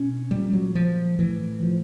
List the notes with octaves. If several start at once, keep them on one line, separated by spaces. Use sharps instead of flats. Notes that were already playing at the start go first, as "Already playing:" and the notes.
Already playing: B2 C#4
A#2 G3
F#3
F3
A2 E3
F3